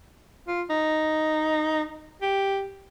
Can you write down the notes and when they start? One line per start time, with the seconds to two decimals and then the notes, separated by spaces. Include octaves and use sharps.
0.47 F4
0.70 D#4
2.22 G4